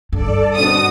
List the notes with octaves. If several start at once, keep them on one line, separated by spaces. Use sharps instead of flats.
G2 A4 D5
B2 D3 C4 F#4 D#6